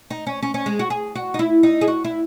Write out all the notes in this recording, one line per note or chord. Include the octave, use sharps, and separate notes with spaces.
D#4
C#4
C#4
C#4
G#3
F#4
G#4
F#4
D#4
E4
D#4
G#4
F#4
E4